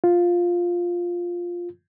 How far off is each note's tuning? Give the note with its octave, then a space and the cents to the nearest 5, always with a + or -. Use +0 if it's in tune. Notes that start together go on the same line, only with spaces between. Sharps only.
F4 +5